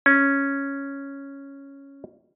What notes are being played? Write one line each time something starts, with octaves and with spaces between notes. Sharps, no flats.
C#4